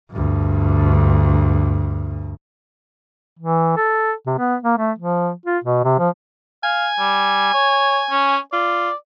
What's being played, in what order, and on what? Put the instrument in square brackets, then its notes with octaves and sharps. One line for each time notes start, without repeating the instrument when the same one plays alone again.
[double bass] D2 G2
[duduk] E3
A4
C3
B3
A#3
A3
F3
F4
B2
C3
F3
[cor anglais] F5 [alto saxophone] G#5
[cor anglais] G3
C#5
C#4
[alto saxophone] F4 [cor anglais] D5